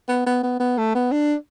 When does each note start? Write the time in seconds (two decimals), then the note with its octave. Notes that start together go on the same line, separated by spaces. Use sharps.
0.08 B3
0.26 B3
0.43 B3
0.60 B3
0.78 A3
0.95 B3
1.12 D4